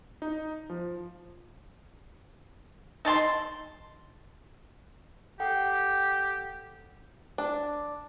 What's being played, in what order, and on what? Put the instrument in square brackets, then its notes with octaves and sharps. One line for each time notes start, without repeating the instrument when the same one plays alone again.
[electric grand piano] D#4
F3
[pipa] D#4 A5 C6
[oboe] G4 [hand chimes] A4 F#5 G5
[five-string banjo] D4